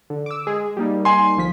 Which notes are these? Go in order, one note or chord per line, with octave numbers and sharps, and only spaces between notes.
D3
D6 E6
G#3 G#4
G3 A#3 D#4
G#5 C6
G1 F3 B6